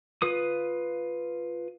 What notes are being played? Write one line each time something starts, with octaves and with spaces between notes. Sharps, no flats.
F4 B4 D#6